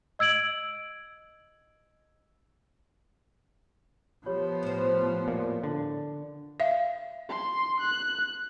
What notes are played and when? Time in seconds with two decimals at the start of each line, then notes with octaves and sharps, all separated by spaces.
0.19 D#5 E6 G#6 D7 F#7
4.26 F3 B3 G4 C#5 B5
4.63 A2 C5
5.28 A#2
5.64 D3
6.60 E5 F5
7.29 C6
7.80 F#6